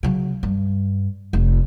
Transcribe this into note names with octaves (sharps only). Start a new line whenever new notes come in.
C#3 F#3
G2
F1